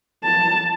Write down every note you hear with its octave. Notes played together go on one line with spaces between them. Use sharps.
A5